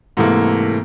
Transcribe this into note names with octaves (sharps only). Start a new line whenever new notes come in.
G#2 C3 E3 A3 A#3